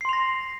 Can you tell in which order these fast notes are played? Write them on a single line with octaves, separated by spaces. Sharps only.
C7 C6 F7 A#6